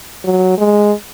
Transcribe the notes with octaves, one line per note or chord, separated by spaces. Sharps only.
F#3
G#3